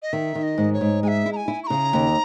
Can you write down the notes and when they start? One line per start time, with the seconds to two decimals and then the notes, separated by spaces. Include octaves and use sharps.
0.02 D#5
0.13 D#3 E5
0.35 D#3
0.43 D#5
0.58 G#2
0.73 C#5
0.81 G#2
1.03 G#3 G#5
1.08 E5
1.26 E4
1.33 A#5
1.36 G#5
1.48 E4
1.64 C#6
1.67 C#3 A#5
1.93 D#2